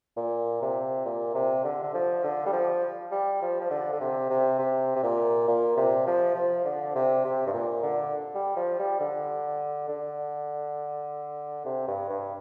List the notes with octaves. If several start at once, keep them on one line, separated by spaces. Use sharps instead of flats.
A#2
C3
A#2
C3
D3
D3
F3
D3
G3
F3
G3
F3
F3
D3
D3
C3
C3
C3
C3
A#2
A#2
C3
F3
F3
D3
C3
C3
G2
A#2
D3
G3
F3
G3
D3
D3
C3
G2
G2